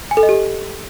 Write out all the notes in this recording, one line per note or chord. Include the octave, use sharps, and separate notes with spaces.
G#5
A4
D#5
G4